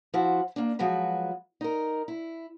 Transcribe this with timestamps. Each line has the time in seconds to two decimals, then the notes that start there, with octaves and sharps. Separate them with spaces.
0.14 F3 E4 F#4 C5
0.56 A#3 D4
0.79 F3 F#3 G#3 F#4 B4
1.61 D#4 A#4
2.08 E4